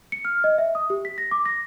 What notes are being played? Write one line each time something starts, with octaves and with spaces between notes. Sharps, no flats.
C#7
F6
D#5
E5
D#6
G4
B6
A#6
D6
A#6